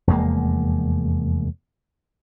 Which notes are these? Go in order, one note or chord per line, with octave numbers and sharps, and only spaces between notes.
F1 E2 G#3 A#3